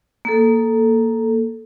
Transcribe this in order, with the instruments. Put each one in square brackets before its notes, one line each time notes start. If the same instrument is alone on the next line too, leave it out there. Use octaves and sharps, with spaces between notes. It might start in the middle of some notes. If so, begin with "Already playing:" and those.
[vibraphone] A#3 A4